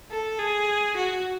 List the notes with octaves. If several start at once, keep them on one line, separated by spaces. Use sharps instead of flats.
A4
G#4
F#4